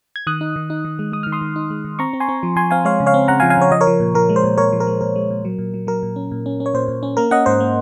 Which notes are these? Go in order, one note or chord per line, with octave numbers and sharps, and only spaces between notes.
G#6
D#3 D#6 F#6
D#4
D#3
D#4
D#3
G#3
G#3 D#6
D#3 F6
C6 D#6
D#3
D#4
G#3
D#3
C4 A#5 C#6
C4
G#5 C6
C4
F3
F3 G#5 C6
C4 F5 G#5
G#3 C#5 F5
C#3
C#5 F5
C4
C#3 F#5 A#5
F3 F5 G#5
F5 G#5
C#3 C#5
F3 D#5
A#4 C#5
F3
A#2
F3 A#4
G#3
C5
A#2
A#2 A#4 C#5
F3
A#4
G#3
A#2 A#4
G#3
A#2
F#3
A#2
F#3
F#3 A#4
A#2
C#4
A#2
C#4
C#4
C#5
A#2 C5
A#2
C#4
A#3 A#4
C#4 D#5 F#5
G#2 C5
A#3